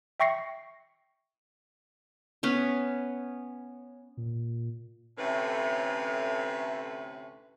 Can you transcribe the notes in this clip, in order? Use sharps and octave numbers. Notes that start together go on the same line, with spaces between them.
E5 G5 C#6 A#6 C7 C#7
B3 C#4 B4
A#2
D2 A2 C3 A3 C#4 B4